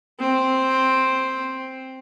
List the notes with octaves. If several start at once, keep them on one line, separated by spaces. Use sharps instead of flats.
C4